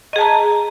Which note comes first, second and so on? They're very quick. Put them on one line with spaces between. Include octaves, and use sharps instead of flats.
D#5 G#4 A5 A#5